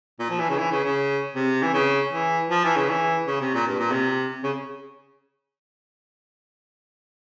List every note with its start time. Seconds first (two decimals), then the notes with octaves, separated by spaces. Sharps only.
0.20 A#2
0.30 F3
0.39 E3
0.50 C#3
0.58 E3
0.72 C#3
0.84 C#3
1.35 C3
1.63 E3
1.73 C#3
2.12 E3
2.50 F3
2.65 E3
2.76 C#3
2.89 E3
3.27 C#3
3.41 C3
3.54 A#2
3.67 G2
3.79 A#2
3.91 C3
4.44 C#3